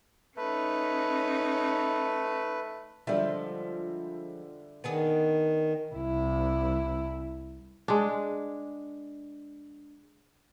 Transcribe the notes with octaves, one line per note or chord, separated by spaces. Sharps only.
A3 C#4 D#4 B4
D3 F3 G3 G#3 E5
D#3 B3 D4 G#4
C2 E4
G#3 D4